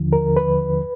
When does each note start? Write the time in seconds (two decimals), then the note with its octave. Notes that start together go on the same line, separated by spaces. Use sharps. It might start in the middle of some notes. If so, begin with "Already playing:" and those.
Already playing: D#2 D3 F3
0.13 A#4
0.37 B4